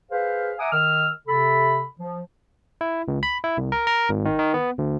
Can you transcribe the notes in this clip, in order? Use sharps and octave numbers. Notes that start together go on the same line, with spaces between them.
G#4 B4 C5 F5
E5 F#5 G#5 A#5 D6 D#6
D#3 D#5 E6 F6
C3 A4 B5
F3
E4
C#2
B5
E4
C2
A#4
A#4
G#1
D#3
D#3
B3
D2